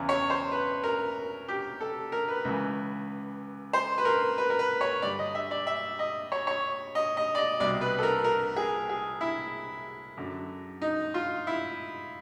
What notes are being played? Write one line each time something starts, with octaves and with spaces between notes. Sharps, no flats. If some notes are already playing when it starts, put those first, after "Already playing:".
Already playing: E2 C#3 E3
C#5
C5
B4
A#4
G4
A4
A#4
B4
C#2 C#3 E3
C5
B4
A#4
B4
A#4
B4
C#5
G2 D3 D5
D#5
E5
D5
E5
D#5
C#5
C#5
D#5
D#5
D5
D#5
C2 B2 D5
B4
A4
A#4
A#4
G#4
G#4
E4
F#2 D3
D#4
F4
E4